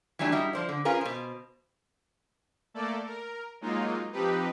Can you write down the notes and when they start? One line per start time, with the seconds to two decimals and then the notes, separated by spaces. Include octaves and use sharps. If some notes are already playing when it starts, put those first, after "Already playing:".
0.19 E3 F#3 G3 A3 D4
0.32 G3 D#4 E4 F#4
0.53 F3 C5 D5
0.69 D3
0.85 C#4 F4 G#4 A#4 B4
1.01 B2 C5
2.74 A3 A#3 A4 D5
3.06 A#4
3.61 F#3 G#3 A#3 D#4 F4
4.12 F3 C4 D#4 G4 B4